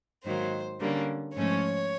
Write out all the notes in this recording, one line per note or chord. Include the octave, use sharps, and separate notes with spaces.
G#2 D#3 F#3 A#3 C5
D3 G3 A#3 C#4
G#2 F3 A3 C#4 C#5